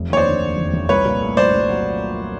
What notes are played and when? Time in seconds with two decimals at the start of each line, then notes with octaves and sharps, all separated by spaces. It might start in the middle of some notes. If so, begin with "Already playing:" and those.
Already playing: F1
0.10 D#2 C#5
0.17 C5 D5
0.25 D3
0.42 D#2
0.58 F1
0.74 F1
0.89 C2 B4 C#5
1.05 A#2
1.22 A3
1.37 C2 C5 D5
1.53 C2
1.69 F#3